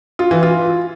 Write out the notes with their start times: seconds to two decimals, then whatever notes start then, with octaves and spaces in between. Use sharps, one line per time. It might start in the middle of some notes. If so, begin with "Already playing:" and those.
0.19 F4
0.31 E3
0.43 F4